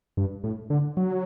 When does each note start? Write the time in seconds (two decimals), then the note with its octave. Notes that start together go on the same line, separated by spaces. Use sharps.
0.17 G2
0.44 A2
0.70 D3
0.97 F#3